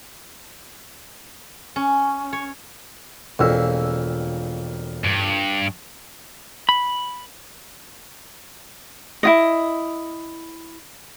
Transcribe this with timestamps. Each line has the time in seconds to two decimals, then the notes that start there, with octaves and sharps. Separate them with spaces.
1.76 C#4
2.33 C#5
3.39 E1 F2 A#2 E6
5.05 G2
6.69 B5
9.23 E4 F4 D#5